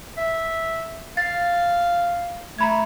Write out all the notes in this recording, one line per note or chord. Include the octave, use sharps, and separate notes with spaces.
E5
F5 A6
A3 A#5 B5 G#6